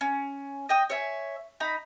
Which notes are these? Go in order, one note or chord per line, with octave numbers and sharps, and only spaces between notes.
C#4
D#5 G5 D#6
C#5 E5 G#5
D#4 A#5 B5